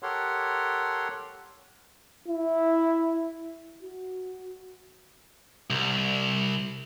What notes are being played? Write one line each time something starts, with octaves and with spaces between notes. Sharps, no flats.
G4 A4 A#4 C#5 F#5 C6
E4
F#4
C2